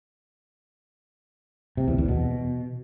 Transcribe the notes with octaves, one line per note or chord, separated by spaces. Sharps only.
C3
E2
E2
B2